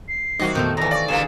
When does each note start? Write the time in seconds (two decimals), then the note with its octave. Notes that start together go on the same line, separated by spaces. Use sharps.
0.08 C7
0.39 C3 E3 G3 A#3 D#4 F#4 D#5
0.55 F2 A#2 D#3 F3 A3 B3 G6
0.77 E2 D#3 E3 A#5 A#6
0.91 D5 F5 C#6
1.08 G2 D3 A#3 G#4 E7